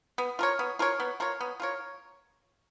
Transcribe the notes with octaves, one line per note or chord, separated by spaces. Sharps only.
B3
F4 A#4 C#5
B3
F4 A#4 C#5
B3
F4 A#4 C#5
B3
F4 A#4 C#5